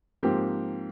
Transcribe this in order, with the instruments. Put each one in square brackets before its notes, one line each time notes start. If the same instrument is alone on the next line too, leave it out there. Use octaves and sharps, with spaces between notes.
[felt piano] G#2 F3 A#3 C4 G4